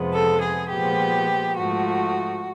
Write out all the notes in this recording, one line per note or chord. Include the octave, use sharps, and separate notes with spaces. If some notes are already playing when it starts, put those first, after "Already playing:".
Already playing: F2 C3 F3 G#3 B3
A4
G#4
A#2 F3 G#3 B3 G4
G#2 F3 A3 F#4